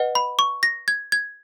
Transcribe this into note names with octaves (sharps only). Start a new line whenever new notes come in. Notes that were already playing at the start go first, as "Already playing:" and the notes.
Already playing: B4 D#5 F#5
B5
C#6
A#6
G#6
G#6